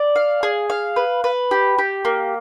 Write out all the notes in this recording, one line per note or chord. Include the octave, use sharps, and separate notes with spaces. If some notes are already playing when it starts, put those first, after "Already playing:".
Already playing: D5
F5
G#4
F5
B4
B4
G4
G4
A#3